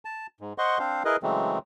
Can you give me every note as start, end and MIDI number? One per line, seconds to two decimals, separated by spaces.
0.05 0.27 81
0.41 0.53 44
0.58 0.78 72
0.58 0.78 75
0.58 0.78 78
0.58 0.78 84
0.58 0.78 85
0.79 1.03 60
0.79 1.03 62
0.79 1.03 72
0.79 1.03 77
1.05 1.16 64
1.05 1.16 68
1.05 1.16 70
1.05 1.16 71
1.05 1.16 75
1.23 1.59 49
1.23 1.59 52
1.23 1.59 54
1.23 1.59 56
1.23 1.59 57
1.23 1.59 60